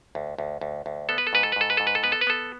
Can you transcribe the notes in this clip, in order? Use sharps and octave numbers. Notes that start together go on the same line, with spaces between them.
D2
D2
D2
D2
B3 A4
B4
A4
G#2 B4
A4
B4
G#2 A4
B4
G#2 A4
B4
A4
B3 B4
A4
B4
B3 A4